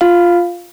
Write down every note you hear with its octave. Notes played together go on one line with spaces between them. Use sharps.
F4 F5